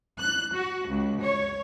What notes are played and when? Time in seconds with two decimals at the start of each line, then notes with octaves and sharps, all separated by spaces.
0.19 F#6
0.56 F#4
0.90 C#2
1.22 C#5